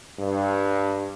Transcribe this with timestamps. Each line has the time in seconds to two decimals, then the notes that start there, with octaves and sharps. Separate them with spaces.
0.20 G2